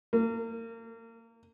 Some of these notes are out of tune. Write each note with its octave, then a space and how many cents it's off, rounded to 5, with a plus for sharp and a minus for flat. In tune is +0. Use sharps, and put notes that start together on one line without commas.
A#3 -30